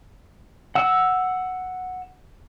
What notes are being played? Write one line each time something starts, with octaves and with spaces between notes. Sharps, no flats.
F#5 E6